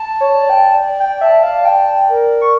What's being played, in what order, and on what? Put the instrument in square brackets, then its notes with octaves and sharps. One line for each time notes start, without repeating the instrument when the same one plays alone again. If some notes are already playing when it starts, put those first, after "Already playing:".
Already playing: [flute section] A5
[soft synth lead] C#5
[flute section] D5
[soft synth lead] G5
[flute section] D5
[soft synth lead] G5
[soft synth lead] E5 [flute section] A5
[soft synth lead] F5
[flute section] D5 [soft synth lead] G5
[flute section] A#4
[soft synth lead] C#6